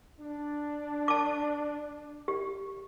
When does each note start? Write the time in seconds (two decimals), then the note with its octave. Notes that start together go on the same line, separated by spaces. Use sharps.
0.21 D4
1.08 A5 D6
2.28 G4